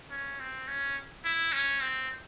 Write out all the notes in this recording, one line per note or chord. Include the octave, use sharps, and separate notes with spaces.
C#4
C4
C#4
E4
C#4
C4